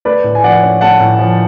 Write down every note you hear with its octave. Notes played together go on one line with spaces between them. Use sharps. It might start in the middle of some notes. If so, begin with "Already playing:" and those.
A3 B4 D5
A2
G#5
F3 D5 F#5
C#4
A3 F#5 A5
A2
F3